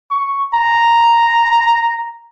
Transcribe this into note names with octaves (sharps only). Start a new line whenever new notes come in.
C#6
A#5